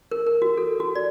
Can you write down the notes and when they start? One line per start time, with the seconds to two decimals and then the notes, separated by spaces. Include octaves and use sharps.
0.11 A#4
0.27 A#4
0.42 F#4
0.57 A4
0.80 F#4
0.95 D5